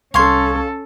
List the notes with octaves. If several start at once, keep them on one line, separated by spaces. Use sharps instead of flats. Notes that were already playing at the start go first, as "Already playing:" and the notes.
C2 C#4 A4 F5 C6 C#6 G#6